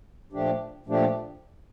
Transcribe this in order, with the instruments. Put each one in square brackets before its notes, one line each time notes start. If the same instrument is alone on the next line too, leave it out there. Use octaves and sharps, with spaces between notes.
[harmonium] A#2 F3 A3 D4 G4
A#2 F3 A3 D4 G4